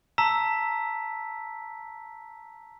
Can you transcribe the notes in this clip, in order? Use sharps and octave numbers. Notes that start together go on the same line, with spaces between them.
A5 A#5 E6 B6